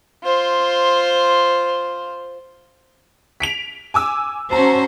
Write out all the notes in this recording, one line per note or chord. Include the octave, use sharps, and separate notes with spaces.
F4 C5
B6 D7 F7
G#5 D6 E6
C#4 F#4 C5 A5 A#5